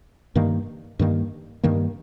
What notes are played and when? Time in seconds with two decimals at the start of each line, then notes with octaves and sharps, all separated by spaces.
0.35 G2 D#3 A#3
0.99 G2 D#3 A#3
1.63 G2 D#3 A#3